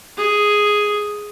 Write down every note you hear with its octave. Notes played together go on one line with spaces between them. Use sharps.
G#4